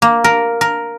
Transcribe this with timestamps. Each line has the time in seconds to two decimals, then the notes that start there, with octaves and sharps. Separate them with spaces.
0.02 A#3
0.24 A#4
0.61 A#4